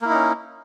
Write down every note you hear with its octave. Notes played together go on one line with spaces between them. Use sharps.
A#3 C#4 D#4 E4